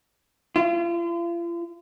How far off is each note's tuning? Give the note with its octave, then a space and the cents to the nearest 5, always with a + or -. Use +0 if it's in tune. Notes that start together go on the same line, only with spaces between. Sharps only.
F4 -40